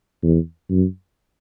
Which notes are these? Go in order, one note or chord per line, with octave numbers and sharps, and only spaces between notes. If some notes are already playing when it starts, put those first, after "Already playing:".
E2
F#2